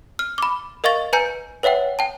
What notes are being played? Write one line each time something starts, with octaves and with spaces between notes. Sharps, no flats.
F6
B5 D6
A#4 D#5 F5 C#6 A6
B4 G#5 A#5 G6 C#7
B4 C#5 E5 F#5 G5
G5 A5